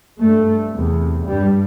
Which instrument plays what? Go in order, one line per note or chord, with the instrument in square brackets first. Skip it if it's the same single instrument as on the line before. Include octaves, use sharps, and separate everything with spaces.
[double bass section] G2 A3
E2 C3
G2 G3